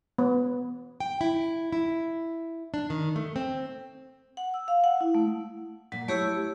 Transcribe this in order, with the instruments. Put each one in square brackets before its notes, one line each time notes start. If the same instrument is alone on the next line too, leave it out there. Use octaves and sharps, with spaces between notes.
[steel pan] B3
[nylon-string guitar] G5
E4
E4
D4
D#3
A3
C4
[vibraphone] F#5
E6
F5
F#5
E4
A3
[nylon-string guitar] A#2 [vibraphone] F#3
[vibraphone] A3 G4 E6 [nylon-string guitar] E4 C#5